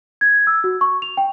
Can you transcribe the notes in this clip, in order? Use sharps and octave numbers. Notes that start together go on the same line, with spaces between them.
G#6
E6
F#4
C#6
F7
G5